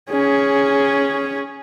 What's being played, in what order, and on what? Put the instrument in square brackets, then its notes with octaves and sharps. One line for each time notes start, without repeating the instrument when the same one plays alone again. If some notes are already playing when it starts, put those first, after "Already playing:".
[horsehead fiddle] C#4 G#4